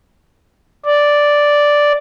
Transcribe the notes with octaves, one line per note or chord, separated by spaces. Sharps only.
D5